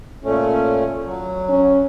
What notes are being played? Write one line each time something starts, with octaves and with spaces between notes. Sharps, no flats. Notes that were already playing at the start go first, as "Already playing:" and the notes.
A#2 A3 C#4
F#3
C#4